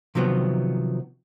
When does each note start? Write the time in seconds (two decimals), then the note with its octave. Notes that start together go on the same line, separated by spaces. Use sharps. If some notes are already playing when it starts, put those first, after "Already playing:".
0.15 C3 D#3 F3 F#3 B3